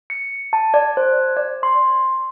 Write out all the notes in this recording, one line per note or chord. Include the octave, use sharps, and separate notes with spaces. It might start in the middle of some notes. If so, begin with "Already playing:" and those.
C#7
A5
D5
C5
D5
C6